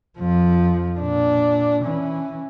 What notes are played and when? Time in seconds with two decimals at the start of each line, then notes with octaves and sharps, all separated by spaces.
0.19 F2 F3
0.99 A#2 D4
1.84 E3 C#4